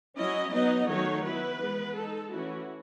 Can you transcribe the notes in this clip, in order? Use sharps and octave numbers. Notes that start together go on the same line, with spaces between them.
F#3 C#4 E4 D#5
F#3 B3 D#4 D#5
D#3 F#3 A3 D#4 C#5
F#3 B3 E4 B4
E3 G#3 B3
G#3 D#4 A4
E3 A3 C#4 E4 F#4